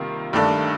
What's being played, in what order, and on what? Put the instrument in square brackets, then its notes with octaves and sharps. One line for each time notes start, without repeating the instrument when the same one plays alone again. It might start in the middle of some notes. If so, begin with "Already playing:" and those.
Already playing: [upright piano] C3 D#3 G3 A#3 F4
G2 D#3 A3 D4 A4